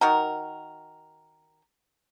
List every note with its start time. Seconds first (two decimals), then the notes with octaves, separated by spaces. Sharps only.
0.01 D#3 F#4 A#4